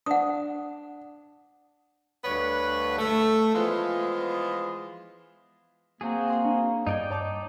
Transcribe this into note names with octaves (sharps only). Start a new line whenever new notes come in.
D4 F#5 D#6
D2 G2 F#4 B4 C#5
A3
E3 F3 G#3 B3 F4
A#3 C4 F#4 G#4
G5 C6 D#6
D4
G2 D#4 D5 D#5 G5 G#6
C#5 A5 D6